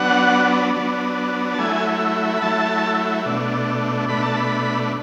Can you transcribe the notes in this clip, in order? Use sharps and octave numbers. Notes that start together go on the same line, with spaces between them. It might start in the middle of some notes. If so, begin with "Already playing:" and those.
Already playing: F#3 B3 D4 F#5
F#3 B3 D4
A5
F#3 A3 E4 G#5
B5
F#3 A3 E4 A5
B2 A3 D4
B2 A3 D4 B5
A5
B5